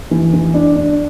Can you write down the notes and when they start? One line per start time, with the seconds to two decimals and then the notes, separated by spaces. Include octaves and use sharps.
0.11 E3
0.34 E3
0.54 D4
0.76 D4